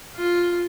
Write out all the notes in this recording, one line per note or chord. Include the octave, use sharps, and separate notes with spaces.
F4